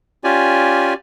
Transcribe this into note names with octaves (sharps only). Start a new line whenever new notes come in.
C#4 F4 G4 D5 G#5